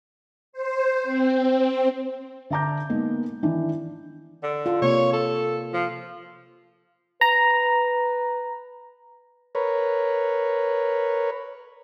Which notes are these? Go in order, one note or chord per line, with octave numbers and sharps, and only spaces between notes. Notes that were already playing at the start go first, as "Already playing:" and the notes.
C5
C4
D3 E5 A5 A#5 D6 G6
G#3 A#3 B3 D#4
D#3 E3 D4
D3
F4 A4
C3 A#3 C#5
A4
F3
B4 A#5
A#4 B4 C#5